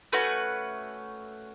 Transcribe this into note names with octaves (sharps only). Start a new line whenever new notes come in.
A3 C#4 F#4 B4